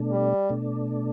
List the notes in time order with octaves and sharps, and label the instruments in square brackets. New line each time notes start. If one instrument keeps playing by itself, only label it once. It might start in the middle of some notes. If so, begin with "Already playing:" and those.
Already playing: [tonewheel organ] B2 A3 D4
[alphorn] G3
[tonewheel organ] B2 A3 D4